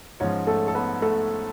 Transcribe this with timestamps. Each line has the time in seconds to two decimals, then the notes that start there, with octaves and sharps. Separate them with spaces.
0.20 G#2 F3 C#4 C#5
0.47 A3 A4
0.68 A4
0.75 B3 B4
1.02 A3 A4